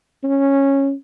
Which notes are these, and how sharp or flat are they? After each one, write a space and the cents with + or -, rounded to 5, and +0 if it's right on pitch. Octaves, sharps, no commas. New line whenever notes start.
C#4 -10